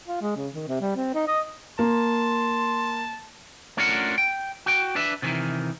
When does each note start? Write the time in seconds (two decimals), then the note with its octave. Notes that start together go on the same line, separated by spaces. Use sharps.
0.08 F4
0.22 G#3
0.36 C#3
0.54 D#3
0.68 C3
0.81 G3
0.96 C4
1.15 D#4
1.27 D#5
1.79 A#3 A5 C6
3.77 A3 C#4 D4 F4 A#4 F#5
4.18 G5
4.66 F#4 G5
4.95 D4 B4 E5
5.22 C3 D#3 E3